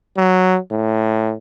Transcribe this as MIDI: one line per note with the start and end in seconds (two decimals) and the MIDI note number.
0.17 0.58 54
0.71 1.35 45